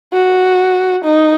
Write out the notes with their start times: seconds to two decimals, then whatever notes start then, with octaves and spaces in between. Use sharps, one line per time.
0.13 F#4
1.05 D#4